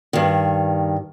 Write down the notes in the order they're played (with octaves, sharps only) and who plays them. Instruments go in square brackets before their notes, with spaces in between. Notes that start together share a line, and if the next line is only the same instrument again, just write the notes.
[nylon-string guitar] G2 D#3